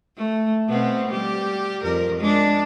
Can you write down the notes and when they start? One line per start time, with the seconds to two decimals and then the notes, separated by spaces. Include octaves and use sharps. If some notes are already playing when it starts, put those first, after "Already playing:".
0.17 A3
0.68 B2 B3 C4
1.11 G3 G4
1.82 F2 A#4
2.20 G#3 D4